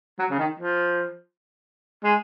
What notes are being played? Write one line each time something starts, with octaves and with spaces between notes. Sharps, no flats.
F#3
C#3
D#3
F3
G#3